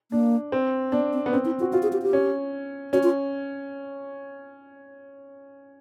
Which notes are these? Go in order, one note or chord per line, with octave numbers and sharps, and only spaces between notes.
A#3 D4
C4
B3 D4
C4
B3
C4 C#4
E4
F4 F#4
F4 F#4
G#4
G4
G4
C#4
C#4 F#4
F4